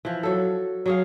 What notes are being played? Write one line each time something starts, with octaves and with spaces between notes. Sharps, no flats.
E3 F3
F#3 A4
F#3 G#4 F5